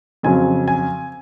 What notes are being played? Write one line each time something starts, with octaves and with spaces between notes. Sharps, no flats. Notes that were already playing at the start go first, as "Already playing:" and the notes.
F2 C#3 F#3 G#5
G#5